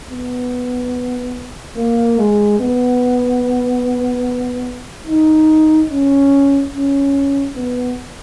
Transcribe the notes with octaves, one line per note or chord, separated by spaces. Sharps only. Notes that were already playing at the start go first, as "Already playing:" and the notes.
B3
A#3
G#3
B3
D#4
C#4
C#4
B3